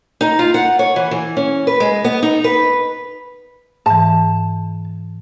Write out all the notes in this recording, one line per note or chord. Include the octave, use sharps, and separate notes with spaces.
D#4
F4
F#5
C#5
E3
E3
C#4
B4
G#3
B3
D#4
B4
G#2 E3 A5